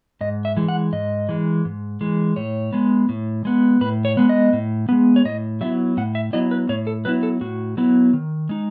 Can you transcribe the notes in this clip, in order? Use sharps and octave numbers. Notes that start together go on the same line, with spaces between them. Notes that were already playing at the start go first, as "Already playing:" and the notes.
G#2 D#5
E5
E3 G#3
F#5
G#2 D#5
E3 G#3
G#2
E3 G#3
A2 C#5
G#3 B3
A2
G#3 B3
A2 B4
C#5
G#3 B3
D#5
A2
G#3 B3
C#5
A2 D#5
F#3 B3 E4 E5
A2 F#5
E5
F#3 B3 E4 D#5
B4
A2 C#5
A4
F#3 B3 E4 B4
A4
A2 F#4
F#3 B3 E4
D#3
G#3 D#4